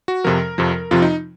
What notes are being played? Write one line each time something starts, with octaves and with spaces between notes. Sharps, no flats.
F#4
F2 C3 F3 A#4
F2 C3 F3
F2 C3 F3 F4
D#4